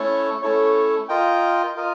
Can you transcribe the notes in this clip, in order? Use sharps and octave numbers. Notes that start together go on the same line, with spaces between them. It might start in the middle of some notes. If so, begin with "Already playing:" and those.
Already playing: A3 C#4 E4 A4 C#5
A3 C#4 E4 A4 C#5
F4 A#4 D#5 G5
F4 A#4 D#5